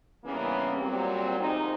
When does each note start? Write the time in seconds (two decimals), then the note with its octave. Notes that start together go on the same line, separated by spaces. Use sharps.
0.25 G2 C#3 E3 A#3 B3 C#4
0.77 A#2 F#3 G3 C4
1.39 F2 G#2 C3 D#3 D#4 C5